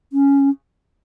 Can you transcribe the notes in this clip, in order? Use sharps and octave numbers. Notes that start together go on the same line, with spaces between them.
C#4